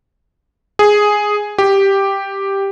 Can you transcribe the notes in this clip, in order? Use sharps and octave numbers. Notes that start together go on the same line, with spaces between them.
G#4
G4